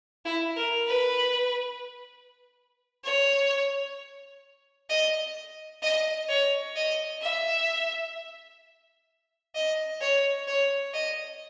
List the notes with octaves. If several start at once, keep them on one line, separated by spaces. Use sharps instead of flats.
E4
A#4
B4
C#5
D#5
D#5
C#5
D#5
E5
D#5
C#5
C#5
D#5